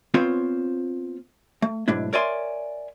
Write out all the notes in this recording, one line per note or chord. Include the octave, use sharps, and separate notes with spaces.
B3 C4 F4 C5 C#5
A3
B1 G#2 A3 D4 E4
A#4 C#5 D5 E5 G#5 C6